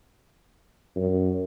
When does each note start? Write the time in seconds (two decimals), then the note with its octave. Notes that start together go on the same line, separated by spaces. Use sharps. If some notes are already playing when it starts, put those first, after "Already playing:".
0.96 F#2